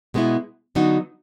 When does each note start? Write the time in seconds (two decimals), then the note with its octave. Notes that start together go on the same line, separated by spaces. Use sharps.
0.14 B2 G#3 B3 E4
0.75 D3 F#3 B3 D#4 F#4